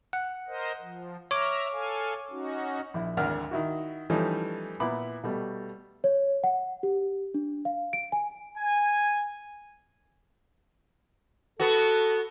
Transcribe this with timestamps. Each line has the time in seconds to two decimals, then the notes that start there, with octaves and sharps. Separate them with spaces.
0.13 F#5
0.48 A#4 C5 D#5
0.80 F3
1.31 C#5 E5 A#5 D6 F6
1.72 A4 F5 G#5
2.31 C#4 D#4 F#4
2.94 A#1 E4
3.17 G#1 D2 A#4 F#5 F6
3.51 D#3 E4 F#4
4.10 E3 F3 G3 A3 C#4 D#4
4.80 A#2 B3 E4 B5 D6
5.23 B2 G3 A3
6.04 C#5
6.44 F#5
6.83 G4
7.34 D4
7.65 F5
7.93 D7
8.12 G#5
8.58 G#5
11.60 B3 F#4 A4